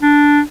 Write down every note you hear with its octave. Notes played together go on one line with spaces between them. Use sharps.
D4